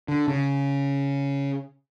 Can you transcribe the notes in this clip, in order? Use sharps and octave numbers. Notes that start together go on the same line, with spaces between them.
D3
C#3